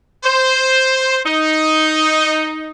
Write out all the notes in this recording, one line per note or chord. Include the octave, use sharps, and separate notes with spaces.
C5
D#4